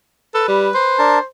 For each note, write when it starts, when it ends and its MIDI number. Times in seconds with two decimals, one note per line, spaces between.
0.34 0.46 69
0.34 0.97 71
0.48 0.69 55
0.75 1.25 72
0.99 1.19 62
0.99 1.19 70
0.99 1.19 81